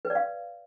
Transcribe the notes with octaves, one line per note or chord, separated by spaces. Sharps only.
B4
D5
F5